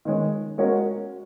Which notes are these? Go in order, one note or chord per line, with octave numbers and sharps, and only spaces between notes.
D#3 G#3 C#4
G#3 C#4 F#4 A#4